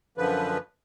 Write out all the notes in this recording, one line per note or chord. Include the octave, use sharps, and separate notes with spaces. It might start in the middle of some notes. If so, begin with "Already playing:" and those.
F#2 D3 F3 B4